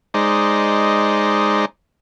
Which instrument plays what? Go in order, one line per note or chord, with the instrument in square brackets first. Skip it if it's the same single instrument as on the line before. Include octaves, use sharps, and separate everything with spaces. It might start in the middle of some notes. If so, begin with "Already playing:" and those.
[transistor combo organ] G#3 D#4 C5 D5